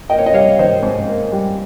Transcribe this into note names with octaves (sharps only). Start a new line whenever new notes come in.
A#3 D#5 G5
C#5
D#5
G3 C#5 F5
D#3 C5 D#5
G#2
A#3
G3